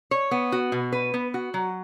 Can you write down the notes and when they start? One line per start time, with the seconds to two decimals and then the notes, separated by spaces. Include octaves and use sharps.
0.11 C#5
0.31 B3
0.52 F#4
0.72 B2
0.92 B4
1.14 B3
1.34 F#4
1.54 F#3